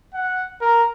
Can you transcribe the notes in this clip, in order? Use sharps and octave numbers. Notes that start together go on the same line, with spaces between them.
F#5
A#4